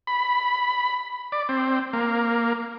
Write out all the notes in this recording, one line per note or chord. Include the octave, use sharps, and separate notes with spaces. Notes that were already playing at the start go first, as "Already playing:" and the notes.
B5
D5
C4
A#3